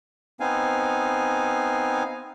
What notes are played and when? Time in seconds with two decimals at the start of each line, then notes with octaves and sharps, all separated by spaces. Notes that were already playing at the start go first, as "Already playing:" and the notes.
0.40 B3 C4 D#4 F5 G#5